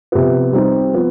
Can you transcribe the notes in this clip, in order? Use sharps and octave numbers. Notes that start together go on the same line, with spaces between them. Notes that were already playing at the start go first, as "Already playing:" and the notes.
C3 F3 B3
G3 C4 D#4 G4
F3 B3